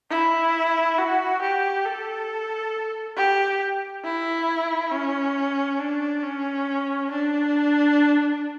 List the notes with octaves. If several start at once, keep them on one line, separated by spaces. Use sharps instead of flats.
E4
F#4
G4
A4
G4
E4
C#4
D4
C#4
D4